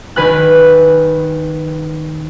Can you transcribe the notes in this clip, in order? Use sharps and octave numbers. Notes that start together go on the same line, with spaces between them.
D#3 B4 G#5 F#6